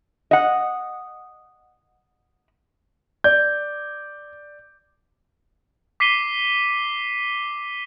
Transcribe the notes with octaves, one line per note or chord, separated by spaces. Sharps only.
D#5 F#5
D5 G6
D6 B6 C7 D#7 G7